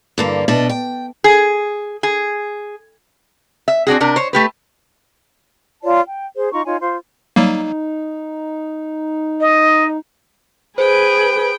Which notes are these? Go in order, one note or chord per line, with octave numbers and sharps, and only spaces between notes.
G2 D3 A#3
B2 D4 D#5 E5
G5
G#4
G#4
E5
C4 D4 F#4 G#4
C3 D4 A#4
C5 C#5
A3 G4 B4
F4 C#5 D5 A5
G5
G#4 C5
D#4 F4 A#5 C#6
D#4 F4 C#5 G#5
F4 C5
F#3 G3 A#3 D#4
D#5
G#4 B4 C5 G5